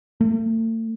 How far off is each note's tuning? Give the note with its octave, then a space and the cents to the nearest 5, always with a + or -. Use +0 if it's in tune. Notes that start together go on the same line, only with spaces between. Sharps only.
A3 +40